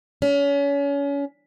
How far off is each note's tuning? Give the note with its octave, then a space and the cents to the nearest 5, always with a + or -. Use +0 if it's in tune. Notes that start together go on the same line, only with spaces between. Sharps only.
C#4 +30